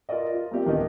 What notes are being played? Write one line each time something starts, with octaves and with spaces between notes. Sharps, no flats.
F4 A#4 B4 D5 D#5
F4
A#3 C4 G4 D5 F5
D1 D#3 E3 B3 D4 D#5